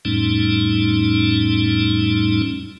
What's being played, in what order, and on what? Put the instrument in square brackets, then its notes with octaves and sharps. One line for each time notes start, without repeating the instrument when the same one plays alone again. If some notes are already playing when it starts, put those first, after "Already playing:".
[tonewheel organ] F2 A2 G3 A3 C#4 D#4